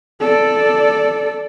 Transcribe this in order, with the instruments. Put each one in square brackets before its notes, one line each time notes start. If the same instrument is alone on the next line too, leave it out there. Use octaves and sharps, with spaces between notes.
[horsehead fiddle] A4 D5